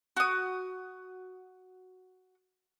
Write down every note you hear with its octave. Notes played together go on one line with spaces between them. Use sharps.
F#4 D#6